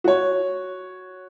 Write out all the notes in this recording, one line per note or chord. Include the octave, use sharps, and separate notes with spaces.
F#4 C#5